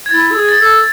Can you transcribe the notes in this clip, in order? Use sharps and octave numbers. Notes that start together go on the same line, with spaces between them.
G#6
E4 A6
A4
G#4
A6
A4